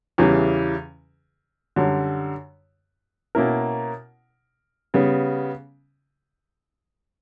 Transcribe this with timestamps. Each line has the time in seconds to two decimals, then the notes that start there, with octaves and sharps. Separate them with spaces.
0.18 E2 C#3 E3 G3
1.76 F#2 D3 G3
3.35 B2 A#3 C#4 E4 A#4
4.94 C#3 G3 B3